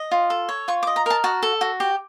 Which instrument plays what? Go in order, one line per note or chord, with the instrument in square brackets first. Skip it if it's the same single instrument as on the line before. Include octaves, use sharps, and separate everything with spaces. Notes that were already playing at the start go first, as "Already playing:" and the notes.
Already playing: [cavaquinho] D#5
F4
A4
C#5
F4 C#6
D6
D#5
A#5
A#4 A5
F#4 A5
A4
F#4
G4